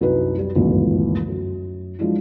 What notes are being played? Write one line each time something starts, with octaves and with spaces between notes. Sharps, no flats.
C2 F#2 D#4 B4
F#2 G3
G1 C#2 F#2 A2 D#3 E3
F#2
F3 F#3 G#3 D4 E4 F#4